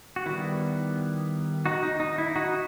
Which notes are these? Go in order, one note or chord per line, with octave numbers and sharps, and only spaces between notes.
F#4
D#3 G3 B3 E4
D#4 F#4
D#4
D#4
E4
D#4 F#4